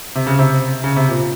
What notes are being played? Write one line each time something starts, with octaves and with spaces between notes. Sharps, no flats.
C3
C#3
C3
C#3
C3
A#2